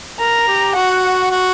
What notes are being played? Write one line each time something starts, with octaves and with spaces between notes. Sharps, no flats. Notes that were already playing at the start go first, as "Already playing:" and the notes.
A#4 A#5
G4
F#4 F#5
F#4